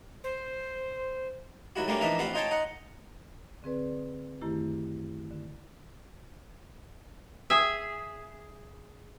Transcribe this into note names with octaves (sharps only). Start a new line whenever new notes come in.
C5
D#2 F#3 E4 F#4
G3 A3 A#3 C#4 D4 D6
E3 F3 A#3 D4 D#4 E5
A1 C4 F4 B4 F#5
D#4 F4 C5 C#5 G5 A5
D#4 F#5
D3 C4 G#4 B4 D5
F#2 D#3 A3 E4 G4
D3
G#4 E5